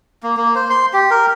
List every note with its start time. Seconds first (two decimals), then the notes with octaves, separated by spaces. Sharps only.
0.23 A#3
0.37 A#3
0.55 C5
0.70 C6
0.93 G4
1.11 A#4